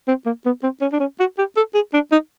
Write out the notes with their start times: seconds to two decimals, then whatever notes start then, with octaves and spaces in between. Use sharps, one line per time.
0.08 C4
0.26 A#3
0.45 B3
0.63 C4
0.81 C#4
0.93 D4
1.00 C#4
1.20 F#4
1.38 G4
1.56 A4
1.74 G#4
1.93 D4
2.12 D#4